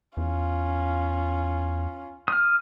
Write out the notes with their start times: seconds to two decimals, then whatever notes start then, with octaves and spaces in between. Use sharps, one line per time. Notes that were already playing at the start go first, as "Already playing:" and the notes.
0.17 E2 C#4 F4
2.28 D#6 F6